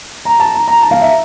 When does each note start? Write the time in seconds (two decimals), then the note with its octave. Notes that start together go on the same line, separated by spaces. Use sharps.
0.25 A#5
0.40 A5
0.54 A#5
0.68 A#5
0.82 A5
0.91 F5
1.01 E5